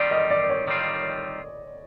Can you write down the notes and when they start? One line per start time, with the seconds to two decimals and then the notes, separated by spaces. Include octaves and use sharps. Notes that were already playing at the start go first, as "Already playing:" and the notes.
Already playing: D#3 G3 C4 F4 D5
0.11 D#5
0.31 D5
0.50 C#5
0.67 D#3 G3 C4 F4